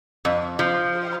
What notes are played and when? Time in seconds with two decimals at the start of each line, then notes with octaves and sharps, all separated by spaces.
0.25 F2
0.59 F3